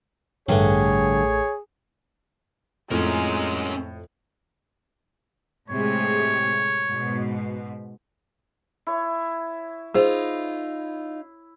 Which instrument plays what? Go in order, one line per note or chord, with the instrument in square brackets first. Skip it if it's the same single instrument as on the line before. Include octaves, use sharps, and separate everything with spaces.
[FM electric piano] A1 A3 [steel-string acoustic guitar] G2 D3 [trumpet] G#4 [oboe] C#5
[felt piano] F2 [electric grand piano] A2 [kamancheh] G#3 [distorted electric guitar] C#4 A#4
[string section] A2 C3 G#3 [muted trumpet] C#5
[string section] G#2 B2
[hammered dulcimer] E4 C#5
[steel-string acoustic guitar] D#4 F4 [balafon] G#4 C5